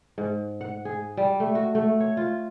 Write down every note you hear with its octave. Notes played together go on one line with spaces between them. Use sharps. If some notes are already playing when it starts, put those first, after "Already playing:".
G#2
F#5
G#4
G3
A3
F#4
A3
C#5
F4